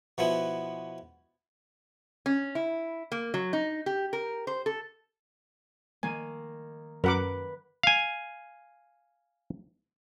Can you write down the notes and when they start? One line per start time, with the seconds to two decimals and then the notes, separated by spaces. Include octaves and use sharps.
0.18 B2 F3 B3 E4
2.26 C#4
2.55 E4
3.12 A#3
3.34 F#3
3.53 D#4
3.86 G4
4.13 A#4
4.47 C5
4.66 A4
6.03 D#3 A#3 G#5
7.04 F#2 A#4 B4 F#5 D6
7.83 F5 G#5